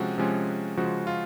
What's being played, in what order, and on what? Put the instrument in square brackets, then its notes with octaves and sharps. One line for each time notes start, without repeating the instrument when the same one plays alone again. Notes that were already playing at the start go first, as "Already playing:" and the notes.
Already playing: [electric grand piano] C3 F3 G#3 C#4 F#4
C3 F3 G#3 C#4
C#3 F3 G#3 F#4
F4